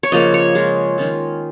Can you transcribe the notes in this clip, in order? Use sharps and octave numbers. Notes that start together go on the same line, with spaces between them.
C#5
C#3 F3 A#3 D#5
C#5
G#3 F4
D#3 C#4 F4